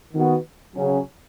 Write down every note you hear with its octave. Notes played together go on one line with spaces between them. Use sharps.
D#3 B3 F#4
C#3 F#3 C#4